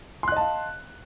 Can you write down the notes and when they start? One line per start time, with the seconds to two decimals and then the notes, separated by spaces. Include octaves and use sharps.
0.23 C6
0.28 F#6
0.32 D#5
0.37 A5
0.41 F5